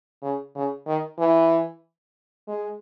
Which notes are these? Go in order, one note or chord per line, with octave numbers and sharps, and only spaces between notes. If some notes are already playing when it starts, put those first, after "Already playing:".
C#3
C#3
D#3
E3
G#3